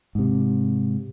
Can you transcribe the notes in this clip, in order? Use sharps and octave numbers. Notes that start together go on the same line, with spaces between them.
G#2 C3